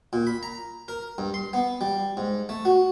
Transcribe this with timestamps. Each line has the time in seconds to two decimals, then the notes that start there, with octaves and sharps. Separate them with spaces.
0.13 A#2
0.27 B5
0.43 A#5
0.88 A#4
1.18 G2
1.34 C6
1.53 B3
1.81 G3
2.17 G#2
2.49 A3
2.65 F#4